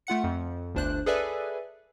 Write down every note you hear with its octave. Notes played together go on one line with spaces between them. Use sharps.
A3 F4 F#5 C#7
F2
G1 D2 D4 C5 F#6
G#4 A4 B4 D5 E5 G#5